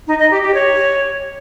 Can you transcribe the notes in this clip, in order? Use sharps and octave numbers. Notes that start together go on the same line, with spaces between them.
D#4
D#5
G4
G4
C#5